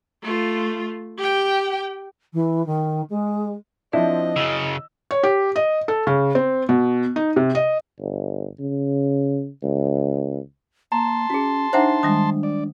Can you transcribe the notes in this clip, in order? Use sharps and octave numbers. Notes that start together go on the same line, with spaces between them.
A3 F4
G4 G5
E3
D#3
G#3
F3 C4 D4 E4 D#5
F#2 C#3 E6
C#5
G4
D#5
A4
C#3
C4
B2
D#4
C3
D#5
G1
C#3
C#2
A#3 A5 A#5 C6
C#4 F#4 G#4
D4 D#4 C5 E5 F#5 G#5 A#5
D#3 G3 G#3 D4 D#6
D5